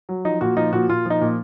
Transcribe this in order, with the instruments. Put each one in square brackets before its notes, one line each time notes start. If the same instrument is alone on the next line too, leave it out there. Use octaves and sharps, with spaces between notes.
[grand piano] F#3
F3 D#4
A#2 F#4
F3 D#4
A#2 F#4
A#2 F4
F3 D#4
A#2